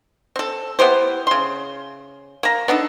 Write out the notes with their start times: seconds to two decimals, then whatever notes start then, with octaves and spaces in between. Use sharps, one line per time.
0.36 C4 A4
0.79 B3 E4 G4 C5
1.27 C#3 C6
2.43 A#3 A#5
2.68 B3 D4 D#4 A4